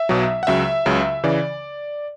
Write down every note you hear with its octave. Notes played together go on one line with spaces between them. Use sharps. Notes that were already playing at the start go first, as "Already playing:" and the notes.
Already playing: E5
B1 B2 F#3
F#5
C#2 C#3 F#3 E5
C#2 C#3 F#3
C#3 E3 D5